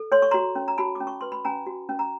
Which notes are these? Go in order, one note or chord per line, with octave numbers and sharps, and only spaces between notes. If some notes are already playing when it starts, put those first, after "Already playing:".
Already playing: A4
C#5 C6
C#6
F#4 A#5 C6
C#4
A#5
F#4 A5 B5
D6
C#4
C#6
B4 C6
B5
C#4 G#5 A#5
F#4
C#4
A#5